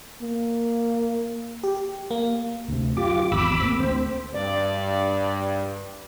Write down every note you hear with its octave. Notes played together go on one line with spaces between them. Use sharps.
A#3
G4
A#3
D2 C3
F#2 F4 G4 D6
G#1 E2 B5 D6 E6
A#3 C4
D2 C4 C5
G2 D5